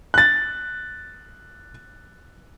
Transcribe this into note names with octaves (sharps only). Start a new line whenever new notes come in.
F#6 A6